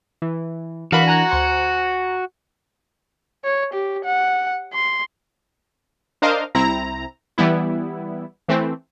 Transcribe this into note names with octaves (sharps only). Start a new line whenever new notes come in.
E3
E3 D4 F#4 A#4 F5 B5
G#5 A#5 F#6
D2 C5 C#7
C#5
G4
F#5
C6
D4 A#4 C5 D#5 F5
C2 C4 E4 A#5
E3 G3 B3 E4
E3 A3 C4